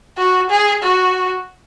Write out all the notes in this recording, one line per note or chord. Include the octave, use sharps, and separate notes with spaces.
F#4
G#4
F#4